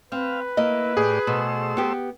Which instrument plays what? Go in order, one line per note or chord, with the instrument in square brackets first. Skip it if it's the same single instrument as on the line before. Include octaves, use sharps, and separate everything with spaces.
[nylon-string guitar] C4 [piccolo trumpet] B4 [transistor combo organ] F5
[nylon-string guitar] A#3 D#5 [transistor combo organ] E4
[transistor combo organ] A2 G4 D5 [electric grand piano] G#4
[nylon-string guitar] B2 [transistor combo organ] A3 C5 E6
[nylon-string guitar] B3 G4